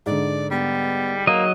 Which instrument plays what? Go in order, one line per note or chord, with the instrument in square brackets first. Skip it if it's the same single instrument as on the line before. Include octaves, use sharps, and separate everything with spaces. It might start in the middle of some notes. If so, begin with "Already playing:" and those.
[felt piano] G#2 D3 [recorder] D5
[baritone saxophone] G3 [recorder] B3
[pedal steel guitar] F#3 D#5 [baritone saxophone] A#3